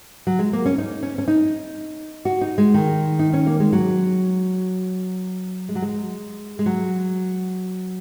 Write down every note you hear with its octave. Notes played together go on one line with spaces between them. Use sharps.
F#3
G#3
A#3
C#4
D#4
C#4
C#4
D#4
F#4
D#4
G#3
D#3
D#4
C#4
A#3
G#3
F#3
G#3
F#3
G#3
G#3
F#3